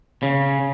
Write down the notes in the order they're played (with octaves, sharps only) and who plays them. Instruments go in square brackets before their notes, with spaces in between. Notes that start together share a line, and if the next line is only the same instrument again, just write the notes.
[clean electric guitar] C#3